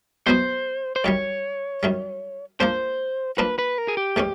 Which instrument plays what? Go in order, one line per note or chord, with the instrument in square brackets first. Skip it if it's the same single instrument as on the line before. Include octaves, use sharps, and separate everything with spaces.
[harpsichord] B2 F#3 B3 E4 [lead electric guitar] C5
[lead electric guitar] C5
[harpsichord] F#2 D#3 G3 [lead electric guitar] C#5
[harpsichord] F#2 D#3 G3
[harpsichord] F3 A#3 D4 [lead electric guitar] C5
[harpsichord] F3 A#3 D4 [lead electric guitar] B4
[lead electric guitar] B4
A#4
G#4
G4
[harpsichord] A2 E3 G#3 C#4